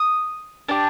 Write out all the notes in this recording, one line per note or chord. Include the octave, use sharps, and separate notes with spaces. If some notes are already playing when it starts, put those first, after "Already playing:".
Already playing: D#6
D4 G4